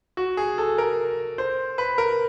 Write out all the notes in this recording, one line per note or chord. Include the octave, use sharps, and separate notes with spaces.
F#4
G#4
A4
A#4
C5
B4
A#4